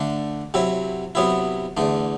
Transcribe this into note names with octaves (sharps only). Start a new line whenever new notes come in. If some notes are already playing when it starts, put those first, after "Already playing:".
Already playing: D3 A3 D4
C3 F#3 C4 E4
C3 F#3 B3 E4
E2 D3 A3